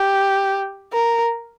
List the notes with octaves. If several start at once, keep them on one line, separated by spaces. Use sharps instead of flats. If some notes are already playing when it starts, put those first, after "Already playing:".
Already playing: G4
A#4